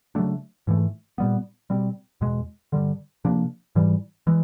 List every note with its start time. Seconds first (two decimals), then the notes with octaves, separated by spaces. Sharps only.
0.15 C#3 F#3 A3 D4
0.67 G#2 E3 A3
1.18 A#2 G3 B3
1.70 B2 G3 C4
2.21 E2 B2 G#3
2.72 G2 D3 G3
3.25 C3 F3 A#3 D4
3.75 G#2 E3 G3
4.27 E3 G#3